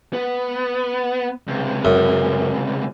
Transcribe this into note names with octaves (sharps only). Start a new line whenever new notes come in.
B3
C#2 C3
F#2